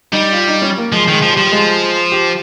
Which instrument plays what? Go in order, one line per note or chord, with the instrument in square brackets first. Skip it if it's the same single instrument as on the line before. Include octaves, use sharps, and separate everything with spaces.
[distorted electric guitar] G3 [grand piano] D#4
[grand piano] F4
D#4
C#4
A#3
[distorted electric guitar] F3 [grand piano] G#3
[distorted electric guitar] D#3 [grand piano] G#3
[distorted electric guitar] F3
[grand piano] G3
[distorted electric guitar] F3
[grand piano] G3
G#3
G4